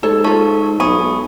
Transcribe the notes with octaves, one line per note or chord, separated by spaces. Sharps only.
G#2 A4 C#5 A5
F4 A4 C#5 A5 C#6
B1 G#5 B5 C#6 D#6